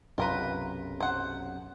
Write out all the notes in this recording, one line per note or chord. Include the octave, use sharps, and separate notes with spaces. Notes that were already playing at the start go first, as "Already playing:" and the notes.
B1 F#2 C3 F4 A#4 B4
C5 F#5